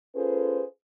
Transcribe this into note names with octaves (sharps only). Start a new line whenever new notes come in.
C#4 F4 G#4 A4 B4 C5